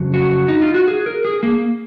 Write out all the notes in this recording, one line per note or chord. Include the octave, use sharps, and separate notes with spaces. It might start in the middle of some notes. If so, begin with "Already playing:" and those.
Already playing: F2 C#3 F#3
F#4
D#4
F4
F#4
G#4
A#4
G#4
A#3